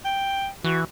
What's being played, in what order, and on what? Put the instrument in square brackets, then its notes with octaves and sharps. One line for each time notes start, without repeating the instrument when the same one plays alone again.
[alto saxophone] G5
[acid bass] E3 [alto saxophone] F#4